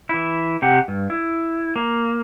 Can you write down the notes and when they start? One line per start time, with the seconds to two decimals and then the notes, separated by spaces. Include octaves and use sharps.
0.09 E3 E4
0.62 C3 G4 F#5
0.88 G2
1.10 E4
1.76 A#3